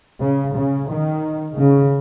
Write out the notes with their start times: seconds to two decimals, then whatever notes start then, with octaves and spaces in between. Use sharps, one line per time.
0.20 C#3
0.55 C#3
0.89 D#3
1.57 C#3